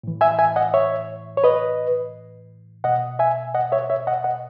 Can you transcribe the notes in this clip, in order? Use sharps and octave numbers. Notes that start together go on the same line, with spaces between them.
A2 E3
E5 G#5
E5 G#5
D#5 F#5
C#5 E5
C#5
B4 D#5
B2 D#5 F#5
E5 G#5
D#5 F#5
C#5 E5
C#5 E5
D#5 F#5
D#5 F#5